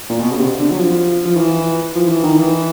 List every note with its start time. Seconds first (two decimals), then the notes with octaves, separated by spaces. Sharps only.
0.10 A#2
0.20 B2
0.31 C#3
0.38 C3
0.59 D3
0.71 F#3
0.79 F3
1.25 F3
1.37 E3
1.95 F3
2.08 E3
2.23 D#3
2.37 E3